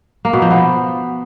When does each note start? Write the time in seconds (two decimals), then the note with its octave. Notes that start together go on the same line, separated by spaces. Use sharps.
0.25 A#3
0.33 B2
0.42 F3
0.50 B3